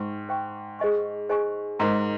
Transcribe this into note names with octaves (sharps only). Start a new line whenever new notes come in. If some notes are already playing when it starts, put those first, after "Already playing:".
Already playing: G#2 G5 C#6
C5 G5 C#6
G#4 C5 D#5 G#5 C#6
G#4 C5 D#5 G#5 C#6
G#2 A#4 D#5 A#5